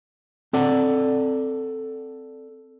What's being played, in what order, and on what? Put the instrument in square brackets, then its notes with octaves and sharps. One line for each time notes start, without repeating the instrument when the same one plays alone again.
[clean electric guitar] C4 A4 D5 F#5